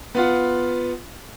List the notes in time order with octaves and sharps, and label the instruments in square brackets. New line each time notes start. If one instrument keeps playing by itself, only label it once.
[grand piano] B3 F4 F#5